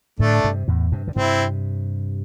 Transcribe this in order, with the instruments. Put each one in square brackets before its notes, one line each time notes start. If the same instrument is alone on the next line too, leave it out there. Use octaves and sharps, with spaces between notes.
[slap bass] A2 D3 [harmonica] A3 D4
[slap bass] G2 C3
E2 A2
G2 C3
D3
[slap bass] G2 C3 [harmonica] C4 E4